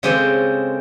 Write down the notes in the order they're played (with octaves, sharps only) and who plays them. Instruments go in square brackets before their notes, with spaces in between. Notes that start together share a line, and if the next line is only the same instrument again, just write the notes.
[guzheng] C#3 G#3 C4 G4 A4 G#5